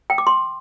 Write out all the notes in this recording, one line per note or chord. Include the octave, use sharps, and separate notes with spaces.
G5
D6
C6